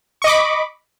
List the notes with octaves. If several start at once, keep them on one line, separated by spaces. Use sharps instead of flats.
D#5 B5 C#6 D6